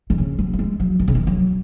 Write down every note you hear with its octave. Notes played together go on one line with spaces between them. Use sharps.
D#3
C#3
F#3
F#3
G#3
F#3
D#3
C#3
D#3
F#3